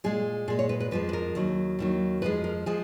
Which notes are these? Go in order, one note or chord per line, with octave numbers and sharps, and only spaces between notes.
A#2 G#3 G#4
A#2 G#3 G#4
C#5
B4
B4
F2 F3 G#3 B4
B4
A#4
D#2 D#3 F#3
D#2 D#3 F#3
F2 F3 G#3 B4
A#4
F3 G#3 G#4